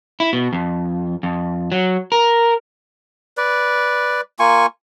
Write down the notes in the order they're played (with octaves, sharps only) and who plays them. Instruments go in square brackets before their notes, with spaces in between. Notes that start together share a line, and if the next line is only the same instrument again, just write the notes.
[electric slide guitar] E4
B2
F2
F2
F#3
A#4
[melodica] B4 D5
A#3 F4 G#5 C#6